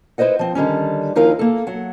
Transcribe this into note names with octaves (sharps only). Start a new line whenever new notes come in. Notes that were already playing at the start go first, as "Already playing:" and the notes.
E4 B4 C5 D#5 F#5
F3 C4
D3 D#3 G3 C#4
D#2 F3 D#4 E4 A#4 F5
A#3 A4
F#3 F#5